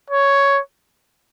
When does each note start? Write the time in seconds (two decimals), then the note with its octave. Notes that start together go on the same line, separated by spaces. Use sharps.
0.10 C#5